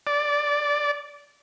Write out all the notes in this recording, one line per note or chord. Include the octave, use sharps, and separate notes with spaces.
D5